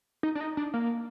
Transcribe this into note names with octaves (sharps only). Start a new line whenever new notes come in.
D#4
D4
D#4
D4
A#3